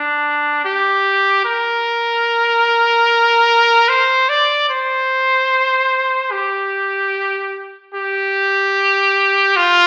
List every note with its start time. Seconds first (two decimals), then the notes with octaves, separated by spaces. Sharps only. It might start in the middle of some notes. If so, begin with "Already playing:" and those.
Already playing: D4
0.65 G4
1.45 A#4
3.89 C5
4.29 D5
4.70 C5
6.32 G4
7.94 G4
9.56 F4